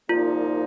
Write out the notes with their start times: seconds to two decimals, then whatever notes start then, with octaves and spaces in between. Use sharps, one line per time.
0.09 C2 A#2 F3 A#3 D#4 F4